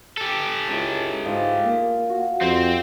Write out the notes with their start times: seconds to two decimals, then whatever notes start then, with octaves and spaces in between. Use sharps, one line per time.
0.17 G4 A4
0.68 C#2 C#4 E4
1.25 G#2 F4 D#5
1.65 A#3
2.09 F#4
2.42 F2 C4 G4 C5